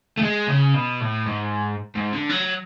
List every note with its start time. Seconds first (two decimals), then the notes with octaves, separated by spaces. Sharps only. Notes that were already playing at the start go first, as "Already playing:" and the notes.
0.17 A3
0.23 G#3
0.48 C#3
0.74 B2
1.00 A2
1.26 G#2
1.96 G#2
2.13 D3
2.29 F#3